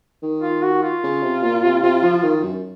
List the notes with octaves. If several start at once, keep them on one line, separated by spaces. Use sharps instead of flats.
D#3
F4
F#4
F4
C#3
C3
A#2
C3
C3
F3
D#3
F#2